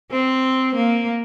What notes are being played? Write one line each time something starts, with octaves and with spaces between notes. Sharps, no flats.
C4
A#3